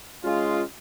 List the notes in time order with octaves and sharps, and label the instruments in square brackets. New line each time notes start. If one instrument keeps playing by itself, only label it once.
[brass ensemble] G#3 C#4 F4